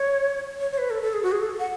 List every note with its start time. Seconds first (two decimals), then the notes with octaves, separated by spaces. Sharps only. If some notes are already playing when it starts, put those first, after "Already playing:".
Already playing: C#5
0.60 C#5
0.72 C#5
0.78 B4
0.90 A4
1.02 A4
1.13 G#4
1.23 F#4
1.32 G#4
1.41 A4
1.59 F#5